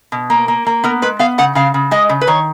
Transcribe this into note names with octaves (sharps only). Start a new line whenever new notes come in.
B2
A#3
A#3
A#3
B3 A#4
G#3 B4
B3 F5
C#3 F#5
C#3 F5
C#3
G#3 D#5
C#3
B4
D#3 C#5